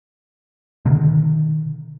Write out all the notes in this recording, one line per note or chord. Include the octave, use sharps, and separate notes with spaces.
B2 D3 D#3